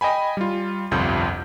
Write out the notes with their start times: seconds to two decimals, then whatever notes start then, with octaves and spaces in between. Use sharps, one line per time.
0.01 D#5 G5 G#5 B5
0.37 G3 F4
0.91 G1 C2 F2 G3 F4 G6